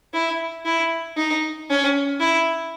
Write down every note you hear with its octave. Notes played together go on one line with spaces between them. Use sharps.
E4
E4
D#4
C#4
E4